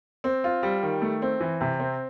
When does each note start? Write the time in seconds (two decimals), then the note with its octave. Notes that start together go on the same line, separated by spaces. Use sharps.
0.24 C4
0.44 F4
0.63 G3
0.83 D#3
1.02 A3
1.22 C4
1.40 E3
1.61 C3
1.80 C4